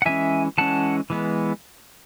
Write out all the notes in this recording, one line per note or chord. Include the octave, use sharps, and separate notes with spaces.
F#5
E3 G#3 C#4 E5 G#5
E3 G#3 C#4 F#5 A5
E3 G#3 B3